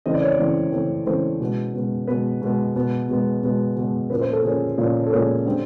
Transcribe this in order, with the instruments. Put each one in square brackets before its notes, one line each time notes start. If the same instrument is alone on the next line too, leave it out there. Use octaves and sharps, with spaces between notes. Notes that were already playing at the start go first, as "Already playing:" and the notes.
[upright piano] C#3 E3 A3 C4 D#5
D5
C#5
D5
C#3 E3 A3 C4
C#3 E3 A3 C4
C#3 E3 A3 C4 C5
B2 G#3 B3
B2 G#3 B3
B2 G#3 B3 B4
B2 G#3 B3
B2 G#3 B3
B2 G#3 B3
B2 G#3 B3
B2 G#3 B3
A#2 F3 A#3 C#4 B4
C5
A4
A#2 F3 A#3 C#4 G#4
A#2 F3 A#3 C#4
A4
A#2 F3 A#3 C#4 G#4
D3 G3 C4